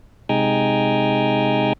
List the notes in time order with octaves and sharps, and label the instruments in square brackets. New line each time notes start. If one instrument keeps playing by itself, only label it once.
[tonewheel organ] C3 G#3 D#4 G5 G#5 A#5